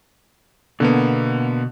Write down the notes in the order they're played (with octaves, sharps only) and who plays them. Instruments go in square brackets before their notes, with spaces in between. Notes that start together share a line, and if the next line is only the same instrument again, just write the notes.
[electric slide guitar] B2 [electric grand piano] D3 A#3 B3